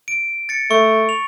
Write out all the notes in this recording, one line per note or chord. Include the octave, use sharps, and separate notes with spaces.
D7
A6 C#7
A3 C#6
F7